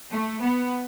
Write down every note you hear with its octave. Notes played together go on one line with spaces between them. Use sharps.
A3
B3